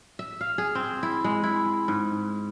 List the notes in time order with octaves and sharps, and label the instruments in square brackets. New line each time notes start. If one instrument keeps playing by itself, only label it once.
[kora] E5
F5
G#4
C4
E4
G#3
E4
G#2